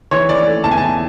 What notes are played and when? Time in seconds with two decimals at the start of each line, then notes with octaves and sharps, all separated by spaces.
0.11 E3 C#5
0.29 E3 D5
0.47 A3
0.64 E2 A5
0.71 G#5
0.78 E2 A5